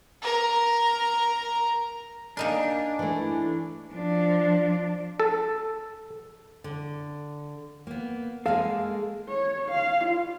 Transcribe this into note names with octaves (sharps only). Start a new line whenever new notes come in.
A#4 A#5
A#3 D4 D#4 A#4 G#5
E3 A3
F3 D4
A4
D3
A#3 B3
G#3 A#3 G#4 A4 F5
C#5
F5
F4